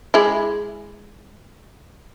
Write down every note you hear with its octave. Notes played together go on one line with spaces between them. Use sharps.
G#3 E4